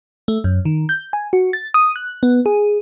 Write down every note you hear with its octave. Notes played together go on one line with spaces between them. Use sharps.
A3
F#2
D#3
G6
G#5
F#4
A6
D#6
F#6
B3
G#4